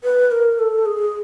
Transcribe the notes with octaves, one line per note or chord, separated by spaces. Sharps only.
B4
A#4
A4
G#4